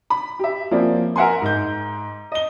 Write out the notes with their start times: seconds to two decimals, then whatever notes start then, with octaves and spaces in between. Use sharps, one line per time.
0.10 B5
0.39 G4 E5
0.71 F3 A#3 C4 C#4 E4 D5
1.16 A#4 E5 F#5 G#5 C6
1.41 G#2 G6
2.32 D#5 G7